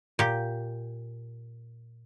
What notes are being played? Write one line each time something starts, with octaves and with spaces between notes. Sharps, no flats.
A#2 G4